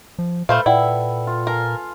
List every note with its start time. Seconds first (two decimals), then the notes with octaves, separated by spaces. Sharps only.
0.19 F3
0.49 A#2 A3 A4 B4 C5 F5 B5
0.66 A#2 E4 D5 F#5 G5
1.27 F4
1.47 A#4 F5 G#5 A5